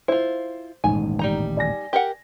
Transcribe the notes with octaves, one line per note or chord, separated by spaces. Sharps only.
E4 F4 C5
D#1 A1 G#2 G#5
G3 D#4 A#5
D5 G#5 A#6
G4 A#4 F#5